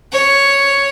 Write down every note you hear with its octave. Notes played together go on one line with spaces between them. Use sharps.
C#5